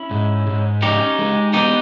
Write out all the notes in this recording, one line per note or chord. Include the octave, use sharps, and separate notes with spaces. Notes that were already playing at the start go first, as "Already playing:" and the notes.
Already playing: C#4 E4
G#2
G#2
C#4 D#4 G4
G#3
B3 D#4 G4